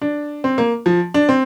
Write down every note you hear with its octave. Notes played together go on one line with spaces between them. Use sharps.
D4
C4
A#3
F3
D4
C4